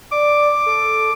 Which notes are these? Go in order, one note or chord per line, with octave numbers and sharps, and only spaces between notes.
D5 D6
A4